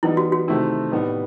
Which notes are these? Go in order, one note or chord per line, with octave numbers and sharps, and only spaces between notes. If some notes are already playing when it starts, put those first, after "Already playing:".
E3 G3 B3 D#4 E4
F#4
F#4
C3 D#3 A3 C4 E4
A2 G3 B3 D#4